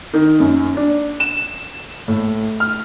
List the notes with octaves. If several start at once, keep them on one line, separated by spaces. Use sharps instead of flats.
D#3
F#2
D4
E7
A2
F6